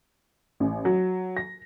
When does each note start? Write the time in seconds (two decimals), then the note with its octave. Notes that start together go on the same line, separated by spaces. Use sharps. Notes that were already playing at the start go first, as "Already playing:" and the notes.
0.60 A1
0.85 F#3
1.37 A#6